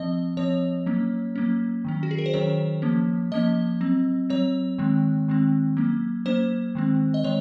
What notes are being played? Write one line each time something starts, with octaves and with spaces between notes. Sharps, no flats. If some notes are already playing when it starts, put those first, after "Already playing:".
Already playing: F3 C4 D#5
F3 C4 C#5
F#3 A#3 C#4
F#3 A#3 C#4
D#3 F#3 C#4
F#4
G#4
A#4
C5
D#3 F#3 C#4 C#5
F3 A#3 C#4
F3 A#3 C#4 D#5
F#3 C4
F#3 C4 C#5
D#3 G#3 C4
D#3 G#3 C4
F#3 A#3 C#4
F#3 A#3 C#4 C5
D#3 G#3 C4
D#5
D#3 G#3 C#5